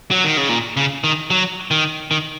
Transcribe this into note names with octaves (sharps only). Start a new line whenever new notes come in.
F#3
D#3
C#3
A#2
C#3
D#3
F#3
D#3
D#3